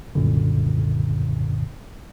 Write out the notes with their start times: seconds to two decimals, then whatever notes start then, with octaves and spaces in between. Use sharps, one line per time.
0.15 C2 F#2 A#2 D3